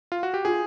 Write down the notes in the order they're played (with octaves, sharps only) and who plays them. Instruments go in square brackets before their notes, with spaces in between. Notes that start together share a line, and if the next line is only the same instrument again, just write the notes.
[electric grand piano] F4
F#4
G4
[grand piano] F4 [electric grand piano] G#4